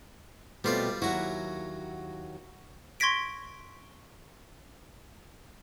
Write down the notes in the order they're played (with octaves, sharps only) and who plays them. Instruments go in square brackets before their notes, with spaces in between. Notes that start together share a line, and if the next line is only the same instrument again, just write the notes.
[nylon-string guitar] B2 A3 C4 [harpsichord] G3 F4 D5
[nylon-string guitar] D#2 F#3 E4 [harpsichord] F#4 A#5
[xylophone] C6 C#6 G#6 A#6 B6 D7